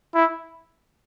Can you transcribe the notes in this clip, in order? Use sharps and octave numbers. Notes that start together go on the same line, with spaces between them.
E4